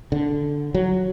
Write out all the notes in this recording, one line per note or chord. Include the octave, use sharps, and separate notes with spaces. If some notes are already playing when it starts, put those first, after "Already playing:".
D3
F#3